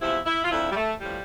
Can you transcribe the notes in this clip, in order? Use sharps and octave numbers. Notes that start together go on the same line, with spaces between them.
E2 C3 F3 E4
E4
F4
F2 D3 F3 E4
G3
A3
A2 F3 G3